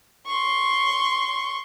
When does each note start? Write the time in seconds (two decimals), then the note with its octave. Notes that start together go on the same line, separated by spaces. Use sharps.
0.27 C6 C#6